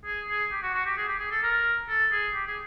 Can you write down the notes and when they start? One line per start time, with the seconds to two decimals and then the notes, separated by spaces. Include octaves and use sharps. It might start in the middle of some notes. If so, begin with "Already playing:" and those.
0.05 G#4
0.28 G#4
0.52 G4
0.63 F#4
0.74 F#4
0.85 G4
0.97 G#4
1.08 G4
1.19 G#4
1.31 A4
1.43 A#4
1.89 A4
2.12 G#4
2.34 G4
2.47 G#4